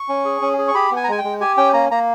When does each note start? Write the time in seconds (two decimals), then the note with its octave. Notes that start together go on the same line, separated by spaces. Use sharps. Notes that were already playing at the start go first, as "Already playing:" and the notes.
Already playing: C#6
0.09 C#4
0.25 G#4
0.42 C#4
0.58 G#4
0.68 C#6
0.75 G4 B5
0.91 B3
0.96 G#5
1.04 A#5
1.08 G#3 G#5
1.18 G5
1.24 G#3
1.41 G4 G#5
1.57 C#4 G5
1.74 A#3 A#5
1.91 A#3 A#5